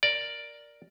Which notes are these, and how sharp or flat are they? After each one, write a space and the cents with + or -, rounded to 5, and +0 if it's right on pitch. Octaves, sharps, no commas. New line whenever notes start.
A#4 +5 D5 +0